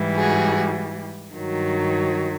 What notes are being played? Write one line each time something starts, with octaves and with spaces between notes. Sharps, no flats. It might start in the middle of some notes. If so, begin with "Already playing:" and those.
Already playing: G#2 E3 G3
F#4 G#4
G2 D#3 F#3